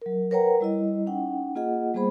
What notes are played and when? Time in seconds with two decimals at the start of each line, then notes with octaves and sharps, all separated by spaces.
0.02 F#3 A#4
0.31 A#4 B4 C#5 F#5 G5 A#5
0.60 G3 E4 D#5
1.07 C#4 D#4 F#5 G5
1.55 A#3 F4 G#4 D#5 F#5
1.94 G3 A#3 B3 G#4 C5 B5